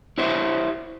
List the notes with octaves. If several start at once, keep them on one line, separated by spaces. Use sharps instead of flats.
E4 G4 C5 C#5 E5